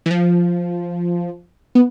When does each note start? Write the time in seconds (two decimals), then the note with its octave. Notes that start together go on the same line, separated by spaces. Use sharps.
0.06 E3
0.11 F3
1.75 B3